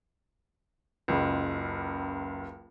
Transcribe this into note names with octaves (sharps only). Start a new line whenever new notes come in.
F#1 C#2